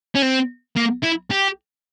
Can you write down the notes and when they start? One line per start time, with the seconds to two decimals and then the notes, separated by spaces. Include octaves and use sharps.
0.15 C#4
0.22 C4
0.76 A#3
1.03 E4
1.31 G4